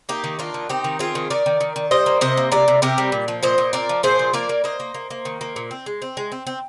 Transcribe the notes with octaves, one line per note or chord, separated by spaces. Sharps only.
A#3 D#4 G4
D#3
A#3 D4 F4
D#3
C4 D#4 G4
D#3
C4 F4 G#4
D#3
D#3 A#4 D5
D#3
D#3
D#3
G3 C5 D#5
A#3
C3 C5 D#5
A#3
C3 A#4 D5
C3
C3 G4 A#4
G3
A#2
F3
A#2 C5 D#5
A#2
C4 A#4 D5
F3
A#2 G#4 C5
F3
A#3 A#4 D5
A#3
A#3 C5 D#5
A#3
A#3
A#3
D#3
A#3
A#2
C4
G#3
C4
G#3
C4
C4